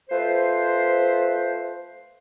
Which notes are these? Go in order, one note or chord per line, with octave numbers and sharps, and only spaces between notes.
A3 F4 B4 C5